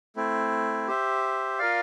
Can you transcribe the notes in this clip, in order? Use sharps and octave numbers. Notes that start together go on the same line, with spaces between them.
A3 C4 E4
G4 C5 E5
F4 A#4 D5 F5